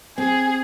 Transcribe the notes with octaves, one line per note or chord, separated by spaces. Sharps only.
C4 G#4